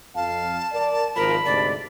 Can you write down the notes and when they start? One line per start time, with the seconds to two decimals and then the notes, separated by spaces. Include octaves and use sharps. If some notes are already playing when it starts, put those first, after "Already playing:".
0.16 F2 F5 A5
0.72 A#4 D5
1.16 G#1 F3 A#4 B5
1.45 D2 G#2 C3 D5